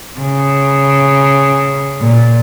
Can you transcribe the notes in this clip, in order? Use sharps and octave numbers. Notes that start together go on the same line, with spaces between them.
C#3
A#2